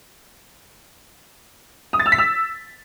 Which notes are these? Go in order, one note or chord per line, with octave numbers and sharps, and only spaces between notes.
D#6
A6
E6
B6
E6